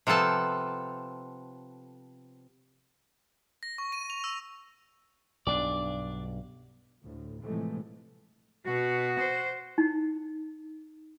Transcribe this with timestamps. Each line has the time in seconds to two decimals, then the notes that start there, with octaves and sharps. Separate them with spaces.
0.07 C3 F3 B3 A4 A5
3.63 A#6
3.78 C#6
3.92 D#7
4.10 F7
4.24 E6
5.47 B1 G2 D4 D5
7.03 D2 A2
7.42 A2 C3 E3 F3 G#3 A3
8.65 B2 F#4
9.19 C5
9.78 D#4